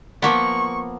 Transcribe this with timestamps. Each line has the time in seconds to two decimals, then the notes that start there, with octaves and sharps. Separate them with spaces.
0.22 F3 A#3 B3 C#6